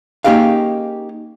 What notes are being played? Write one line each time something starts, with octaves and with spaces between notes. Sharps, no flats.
A#3 C#4 D#4 G4 G#4 F5